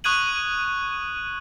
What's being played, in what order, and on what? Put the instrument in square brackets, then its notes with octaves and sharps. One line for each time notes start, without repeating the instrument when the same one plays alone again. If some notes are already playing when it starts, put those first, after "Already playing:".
[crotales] C#6 D#6 F#6 G#6 D#7 F#7